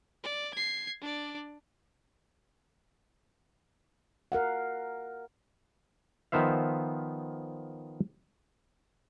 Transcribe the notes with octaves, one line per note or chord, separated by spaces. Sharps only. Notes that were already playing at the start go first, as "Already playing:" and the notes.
D5
G#6 C7
D4 D5
A#4 F5 F#5
D#3 F3 B3 C5 E5 F5